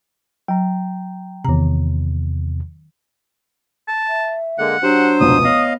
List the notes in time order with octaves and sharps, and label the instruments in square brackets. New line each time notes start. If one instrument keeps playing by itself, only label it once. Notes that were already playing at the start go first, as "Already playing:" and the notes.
[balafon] F#3 [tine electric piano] G5 A#5
[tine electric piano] E2 C3 [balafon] D#3 A#5
[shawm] A5
[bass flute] E5
[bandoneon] D3 G#3 A#3 [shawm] F#5
[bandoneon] F#3 C5 [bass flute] D4 [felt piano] G4
[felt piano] F1 C#2 B2 [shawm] D#6
[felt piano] B3 [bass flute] C#5 [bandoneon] D#5 F5